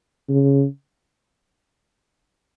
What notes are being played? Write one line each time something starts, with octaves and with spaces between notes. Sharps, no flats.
C#3